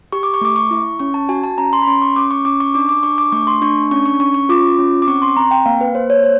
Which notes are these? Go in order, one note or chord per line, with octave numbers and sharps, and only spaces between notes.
G4 C#6
D6
C#6
A3 D6
C#6
E4
C#4 C#6
A5
F#4 G#5
A5
C#4 A#5
C6
B5
C#4 C6
C#6
C#4 D6
C#6
C#4 D6
C#6
D4 D6
D6
D4 C#6
D6
A3 C#6
C6
D4 C#6
C#4 C#6
C#6
C#4 C#6
C#6
F4 D6
C#4
D6
C4 C#6
C6
C4 A#5
G5
A#3 F5
B4
A#3 C5
C#5
C5